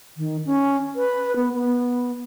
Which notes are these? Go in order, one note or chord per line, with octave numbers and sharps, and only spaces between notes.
D#3
C#4
B4
B3
B3